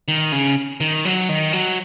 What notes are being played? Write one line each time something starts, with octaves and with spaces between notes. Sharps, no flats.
D#3
C#3
D#3
F#3
D#3
F#3